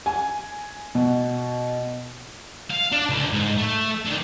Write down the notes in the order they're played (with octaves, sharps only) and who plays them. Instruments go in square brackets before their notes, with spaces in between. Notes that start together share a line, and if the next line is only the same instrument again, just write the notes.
[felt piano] G#5
B2
[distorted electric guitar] F5
D4 D5
C#2 D3
G#2
A3
D3 D#3